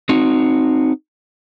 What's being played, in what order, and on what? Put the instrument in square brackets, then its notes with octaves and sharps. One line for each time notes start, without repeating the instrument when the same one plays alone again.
[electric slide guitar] C4 D#4 F#4